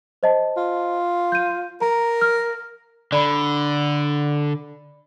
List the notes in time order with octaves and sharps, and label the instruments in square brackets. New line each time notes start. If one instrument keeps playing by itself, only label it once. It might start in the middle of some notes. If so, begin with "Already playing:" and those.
[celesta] C5 D#5 A5
[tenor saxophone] F4
[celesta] G6 D#7
[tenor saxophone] A#4 [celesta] A#5
[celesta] F6
[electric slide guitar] D3 [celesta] D5 B5